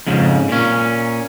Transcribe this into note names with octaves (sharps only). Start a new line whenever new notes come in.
F2 G#2 C#3
A#2 C#4